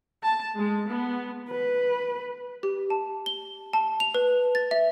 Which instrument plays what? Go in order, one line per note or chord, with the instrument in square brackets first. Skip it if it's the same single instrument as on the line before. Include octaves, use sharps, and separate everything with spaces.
[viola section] A5
G#3
B3
[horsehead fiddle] B4
[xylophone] G4
A5
G7
A5
F7
B4
A6
E5